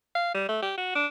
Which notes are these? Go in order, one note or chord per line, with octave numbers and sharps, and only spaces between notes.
F5
G3
A3
G4
F#4
D4